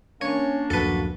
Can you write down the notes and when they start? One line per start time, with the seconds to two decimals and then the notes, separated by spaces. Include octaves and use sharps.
0.21 A#3 C#4 D4 C#5
0.70 D1 F#2 F3 F#4 A4 B4